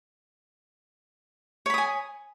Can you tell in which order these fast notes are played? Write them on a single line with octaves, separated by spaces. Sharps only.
C#5 B5 D#6 G#5